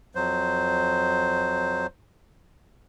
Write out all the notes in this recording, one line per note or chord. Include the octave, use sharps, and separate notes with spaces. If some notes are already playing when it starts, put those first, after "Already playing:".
F2 F#3 C5